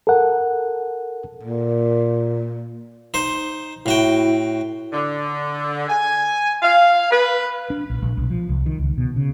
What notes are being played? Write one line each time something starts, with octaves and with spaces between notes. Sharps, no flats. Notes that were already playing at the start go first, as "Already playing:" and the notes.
A4 A#4 F#5
A#2
D#4 C5
A2 E4 F#4 G5
D3
G#5
F5
B4
D4
A#1
A#1
B1
F3
C2
D#3
C#2
B2
C#3